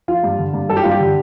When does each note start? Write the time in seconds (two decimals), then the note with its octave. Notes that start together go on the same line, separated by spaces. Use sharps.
0.08 F3 F4
0.23 G2
0.39 D3
0.54 G2
0.69 G3 A4
0.77 G4
0.83 G2 F4
0.91 G4
1.00 D3